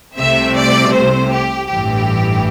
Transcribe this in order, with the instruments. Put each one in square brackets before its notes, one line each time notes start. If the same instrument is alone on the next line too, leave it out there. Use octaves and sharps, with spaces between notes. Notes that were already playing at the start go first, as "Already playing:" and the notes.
[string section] C2 C3 A3 C4 E5
D5
C5
G4
A1 G2 E3 G4